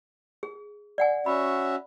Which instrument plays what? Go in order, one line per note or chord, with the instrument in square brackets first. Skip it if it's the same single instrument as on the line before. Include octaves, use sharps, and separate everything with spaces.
[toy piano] G#4
D5 F#5 G#5
[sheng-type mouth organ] C#4 F#4 E5 [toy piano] B5